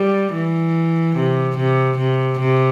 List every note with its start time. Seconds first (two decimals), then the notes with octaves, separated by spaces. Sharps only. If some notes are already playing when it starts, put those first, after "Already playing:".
Already playing: G3
0.34 E3
1.16 C3
1.57 C3
1.98 C3
2.39 C3